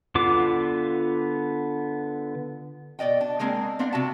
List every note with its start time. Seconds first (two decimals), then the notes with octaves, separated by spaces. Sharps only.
0.15 D3 B3 F4 D6
2.99 B2 D5 D#5 G5
3.21 D4
3.40 G#3 A#3 C4 G#4
3.79 B3 C4 D4 F5
3.93 C3 F#4 A5